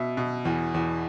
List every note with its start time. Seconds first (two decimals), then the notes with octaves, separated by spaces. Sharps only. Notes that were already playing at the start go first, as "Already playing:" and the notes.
Already playing: B2 E5
0.17 B2
0.45 E2
0.74 E2